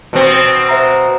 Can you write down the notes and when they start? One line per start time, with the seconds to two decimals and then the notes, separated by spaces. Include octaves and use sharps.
0.13 B2 C4
0.69 C5 E5 A#5